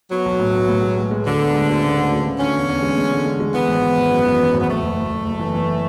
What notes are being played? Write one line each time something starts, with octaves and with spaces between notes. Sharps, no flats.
F#3 B3
B1
A2
B3
A2
G#3
G#3
G#3
D2 D3
B3
G#3
D2
C#3
C#3
D2
C#3
D3 C#4
E2
E2
G#3
G#3
D3
G#3
G#3
E3 B3
G#1
E3
G#1
F#2
E3
F#2
G#1
B3
F#1 A3
F#1
F#1
F#1
F#1
E3
E3